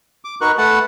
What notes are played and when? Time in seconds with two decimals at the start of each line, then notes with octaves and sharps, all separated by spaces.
0.25 D6
0.41 D#4 F#4 A#4 B4 C#6 F#6
0.58 A3 B4 F#5 A5